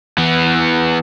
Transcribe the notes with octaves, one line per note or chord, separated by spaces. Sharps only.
E3 B3